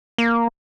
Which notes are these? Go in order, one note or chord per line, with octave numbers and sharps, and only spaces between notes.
A#3